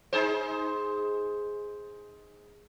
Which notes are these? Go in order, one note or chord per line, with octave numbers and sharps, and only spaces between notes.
D#4 G#4 C5